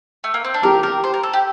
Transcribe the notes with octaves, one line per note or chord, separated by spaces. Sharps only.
A3
A#3
C4
D4
G4 A#4
A#4
C5
A#4
A4
G4